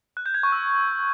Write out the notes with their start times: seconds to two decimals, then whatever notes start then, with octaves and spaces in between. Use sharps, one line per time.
0.17 F#6
0.26 G6
0.34 G#6
0.43 C#6
0.52 E6